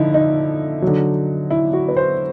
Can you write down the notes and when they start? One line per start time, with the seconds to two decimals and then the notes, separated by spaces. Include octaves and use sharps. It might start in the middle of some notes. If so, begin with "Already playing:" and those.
Already playing: D3 F3 D#4 E4
0.14 D#4
0.82 D3 F#3
1.51 E4
1.73 F#4
1.89 B4
1.97 C5